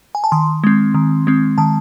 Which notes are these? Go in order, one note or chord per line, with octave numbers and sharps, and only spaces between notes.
G#5
A5
D#3 C6
G#3 C4
D#3
G#3 C4
D#3 A5